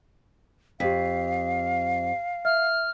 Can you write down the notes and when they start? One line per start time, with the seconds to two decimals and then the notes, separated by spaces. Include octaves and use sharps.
0.80 F2 G4 F5 B6
2.45 E5 F6